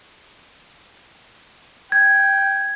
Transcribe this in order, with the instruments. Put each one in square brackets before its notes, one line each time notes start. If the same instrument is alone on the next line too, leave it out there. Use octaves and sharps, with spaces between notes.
[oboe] G5 [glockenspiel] G#6